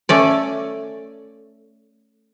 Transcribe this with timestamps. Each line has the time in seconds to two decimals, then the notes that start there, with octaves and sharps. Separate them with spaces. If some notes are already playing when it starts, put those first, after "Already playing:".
0.09 A3 C#4 D5